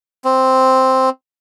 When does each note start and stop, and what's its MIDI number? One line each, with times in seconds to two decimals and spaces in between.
0.25 1.09 60